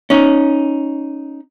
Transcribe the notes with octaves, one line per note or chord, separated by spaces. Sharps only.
C#4 D#4